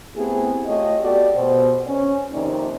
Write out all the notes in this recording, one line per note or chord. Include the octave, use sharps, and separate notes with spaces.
A3 B3 C4 E4 G4 G#4
A3 F4 G4 C#5 D#5
B3 F#4 G4 A4 D5
B2 C5
C#4
F2 C3 D#3 A#3 D#4 D5